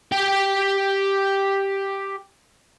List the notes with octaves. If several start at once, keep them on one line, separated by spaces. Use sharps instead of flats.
G4 G5